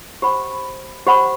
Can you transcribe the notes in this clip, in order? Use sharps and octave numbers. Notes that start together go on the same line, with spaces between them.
G4 C5 F#5 B5
G4 C5 F#5 B5